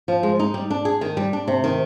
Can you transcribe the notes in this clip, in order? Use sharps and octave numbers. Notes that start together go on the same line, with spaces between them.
F3
G#3
D#4
G3
D4
G#4
D#3
G3
D4
C3
D#3